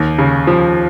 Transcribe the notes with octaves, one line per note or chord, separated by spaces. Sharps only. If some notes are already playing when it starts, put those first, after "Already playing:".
Already playing: D#2
C#3
F3